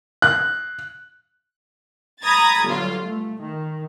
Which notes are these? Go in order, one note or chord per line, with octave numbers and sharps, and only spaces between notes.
F#6
A#5 B5 D#6 G#6 A6
G1 F#3 F4
A3
D#3